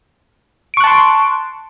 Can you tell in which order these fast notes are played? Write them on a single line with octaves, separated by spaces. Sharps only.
D7 C#6 F#6 A5 C6